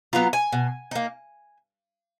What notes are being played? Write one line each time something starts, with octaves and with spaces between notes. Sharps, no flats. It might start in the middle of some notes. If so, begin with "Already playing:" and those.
F#3 B3 F4 A#5
G#5
B2
A#3 D#4